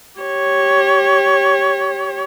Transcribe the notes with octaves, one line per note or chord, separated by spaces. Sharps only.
G4 C#5